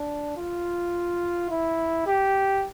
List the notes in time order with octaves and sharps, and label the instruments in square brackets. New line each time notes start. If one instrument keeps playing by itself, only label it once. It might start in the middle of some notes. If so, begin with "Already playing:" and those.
Already playing: [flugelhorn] D4
F4
E4
G4